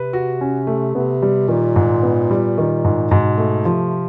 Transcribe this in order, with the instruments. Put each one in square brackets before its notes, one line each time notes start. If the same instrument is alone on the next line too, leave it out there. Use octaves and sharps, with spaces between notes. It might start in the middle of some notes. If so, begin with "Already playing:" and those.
Already playing: [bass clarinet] C3 [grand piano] B4
[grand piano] F#4
C#4
A3
[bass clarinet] C3 [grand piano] B3
[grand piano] G3
[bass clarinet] A#2 [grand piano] D#3
[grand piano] G#2
B3
G3
D#3
G#2
[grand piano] G#2 [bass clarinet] B2
[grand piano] A3
[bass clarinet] C3 [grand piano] F3